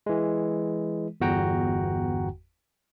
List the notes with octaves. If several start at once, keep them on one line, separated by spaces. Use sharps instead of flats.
E3 G#3
G1 E2 F#4 F#5 G5 A#5